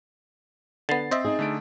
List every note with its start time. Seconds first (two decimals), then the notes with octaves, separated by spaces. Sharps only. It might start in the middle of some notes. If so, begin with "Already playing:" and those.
0.89 D3 B3 A6 C7
1.11 C4 C5 D#5 E5
1.25 D#4 G#4
1.39 D3 A3 D7